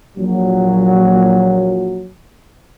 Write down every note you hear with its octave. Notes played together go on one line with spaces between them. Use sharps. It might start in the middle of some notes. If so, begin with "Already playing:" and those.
A#1 A#2 F#3